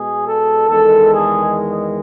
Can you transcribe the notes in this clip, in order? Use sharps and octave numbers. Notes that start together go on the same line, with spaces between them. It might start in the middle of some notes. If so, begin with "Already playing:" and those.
Already playing: B2 G#3 G#4
A4
E2 D#3 G#3 A4
G#4